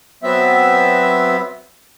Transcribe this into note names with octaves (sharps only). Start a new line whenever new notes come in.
F#3 B3 C4 E5